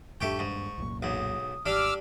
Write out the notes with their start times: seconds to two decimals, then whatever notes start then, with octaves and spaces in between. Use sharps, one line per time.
0.21 D#1 G2 A3 D4 G4 G5 C#6
0.39 G#2
0.78 C2 F#2 A#2
1.03 B1 G#2 D#6
1.66 G#1 G3 D4 D6 E6 F6